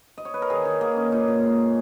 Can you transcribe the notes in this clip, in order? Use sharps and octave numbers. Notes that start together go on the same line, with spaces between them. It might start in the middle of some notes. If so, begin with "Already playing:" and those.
D#5
C#5
B4
A#4
D#3 G#4
D#3
A#3 G#4
C#4
A#2 D#4
A#2
G#3
C#4